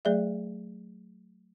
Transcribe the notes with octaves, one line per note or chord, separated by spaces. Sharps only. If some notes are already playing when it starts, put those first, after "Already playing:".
F#3 A3 G#4 D5 E5